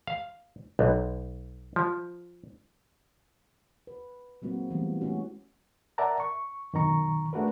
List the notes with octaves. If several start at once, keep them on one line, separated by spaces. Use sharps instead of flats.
F5
B1
F3
B4
F#3 G#3 A#3 C4 F#4
E3 G3 A3 B3
G#3 A3 C#4 F#4
A#4 D5 E5 F#5 A5 A#5
C#6
F#2 B2 D#3 A#5 C#6
A3 D4 F#4 G#4 A#4 B4